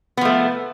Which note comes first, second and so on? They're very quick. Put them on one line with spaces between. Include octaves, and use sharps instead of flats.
B3 F3 A3